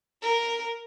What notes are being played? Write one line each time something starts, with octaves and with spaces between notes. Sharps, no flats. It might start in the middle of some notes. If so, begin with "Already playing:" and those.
A#4